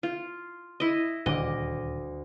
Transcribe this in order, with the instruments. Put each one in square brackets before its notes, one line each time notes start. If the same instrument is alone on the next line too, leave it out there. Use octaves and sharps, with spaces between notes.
[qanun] F4
E4 D#5
[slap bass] D#1 [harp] D2 D6 [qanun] D#5